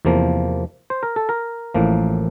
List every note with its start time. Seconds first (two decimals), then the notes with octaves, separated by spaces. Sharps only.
0.05 E2 C3 F3 A#3
0.90 C5
1.03 A#4
1.16 A4
1.29 A#4
1.74 A1 A2 F3 A#3